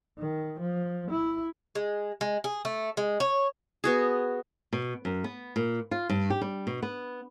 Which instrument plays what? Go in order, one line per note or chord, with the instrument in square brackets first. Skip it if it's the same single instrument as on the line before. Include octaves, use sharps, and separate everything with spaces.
[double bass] D#3
F3
E4
[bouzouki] G#3
G#3
G#4
A3
G#3
C#5
[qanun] B3 F#4 G#4
[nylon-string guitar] B2
F#2
B3
A#2
F4
G2
G4
G3
B2
B3